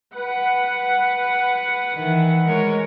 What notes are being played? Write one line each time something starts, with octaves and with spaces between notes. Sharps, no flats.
B4 F#5
D#3 E3
G#3 A#4 C#5